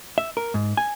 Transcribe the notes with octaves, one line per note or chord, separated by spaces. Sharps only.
E5
A#4
G#2
G#5